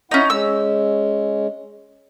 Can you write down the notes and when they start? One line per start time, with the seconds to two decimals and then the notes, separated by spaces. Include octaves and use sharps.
0.11 C#4 D#4 E4 F#5
0.30 G#3 C#4 E6